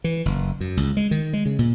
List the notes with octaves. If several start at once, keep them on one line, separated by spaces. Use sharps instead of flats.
E3
F#1
F#2
C#2
G#3
D#3
G#3
C#3
A#2